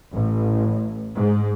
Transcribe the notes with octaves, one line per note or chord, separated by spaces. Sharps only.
A1
G#2